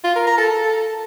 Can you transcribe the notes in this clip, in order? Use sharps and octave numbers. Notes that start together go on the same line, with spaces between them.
F4
A#4
A#5
A4
A4